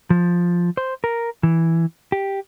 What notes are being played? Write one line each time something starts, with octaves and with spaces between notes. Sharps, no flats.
F3
C5
A#4
E3
G4